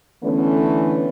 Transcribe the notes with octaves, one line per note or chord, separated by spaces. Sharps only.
D3 E3 A3 B3 C#4